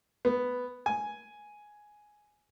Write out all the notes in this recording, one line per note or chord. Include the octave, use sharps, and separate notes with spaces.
B3
G#5